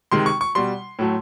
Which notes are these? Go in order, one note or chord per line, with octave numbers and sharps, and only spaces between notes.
C3 D#3 G#3 C6
C#6
C#6
B2 G3 C6
A2 F#3 A3